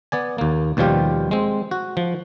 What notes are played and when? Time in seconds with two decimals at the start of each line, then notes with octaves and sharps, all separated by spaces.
0.12 B3 D5 G#5
0.38 D#2 A#3
0.77 D#2 B2 F3 G3 F4 G4
1.31 G#3 C4
1.71 F#4
1.97 F3